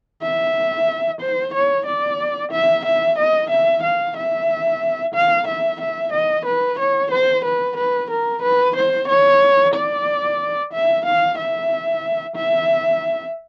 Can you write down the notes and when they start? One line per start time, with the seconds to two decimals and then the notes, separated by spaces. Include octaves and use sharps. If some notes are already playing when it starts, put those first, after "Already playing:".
0.22 E5
1.21 C5
1.53 C#5
1.86 D5
2.51 E5
2.85 E5
3.18 D#5
3.50 E5
3.83 F5
4.16 E5
5.14 F5
5.47 E5
5.80 E5
6.12 D#5
6.45 B4
6.79 C#5
7.11 C5
7.45 B4
7.77 B4
8.10 A#4
8.42 B4
8.76 C5
9.07 C#5
9.74 D5
10.72 E5
11.05 F5
11.38 E5
12.36 E5